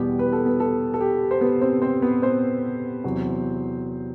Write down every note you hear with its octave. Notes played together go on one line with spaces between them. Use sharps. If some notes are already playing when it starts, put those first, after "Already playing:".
Already playing: E2 B2 G3 B3 G4 G5
B4
A4
B3 B4
A4
A4
G4
C5
B3 B4
C4 C5
C4 C5
B3 B4
C4 C5
E2 C3 F#3